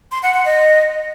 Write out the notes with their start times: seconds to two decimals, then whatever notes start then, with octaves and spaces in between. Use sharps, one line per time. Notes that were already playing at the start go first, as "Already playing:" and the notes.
0.12 C6
0.23 F#5
0.34 F#5
0.45 D#5